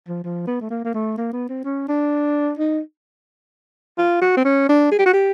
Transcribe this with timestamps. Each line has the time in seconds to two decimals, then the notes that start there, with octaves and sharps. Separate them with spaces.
0.08 F3
0.24 F3
0.47 B3
0.61 A3
0.70 A#3
0.84 A#3
0.94 A3
1.17 A#3
1.33 B3
1.49 C4
1.64 C#4
1.88 D4
2.58 D#4
3.98 F4
4.21 F#4
4.37 C4
4.45 C#4
4.69 D4
4.91 G#4
4.99 G4
5.06 F#4
5.13 G4